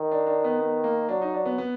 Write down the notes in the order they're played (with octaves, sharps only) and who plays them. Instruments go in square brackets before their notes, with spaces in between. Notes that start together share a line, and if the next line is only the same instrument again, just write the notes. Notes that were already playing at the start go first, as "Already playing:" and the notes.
Already playing: [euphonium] D#3
[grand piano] D4
D4
B3
B3
A#3
[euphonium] F#3 [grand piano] D4
[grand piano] D#4
D4
B3
B3